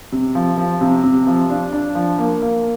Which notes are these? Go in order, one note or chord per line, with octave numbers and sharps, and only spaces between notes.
C3
F3
F3
C3
C3
F3
D4
D4
F3
A#3
A#3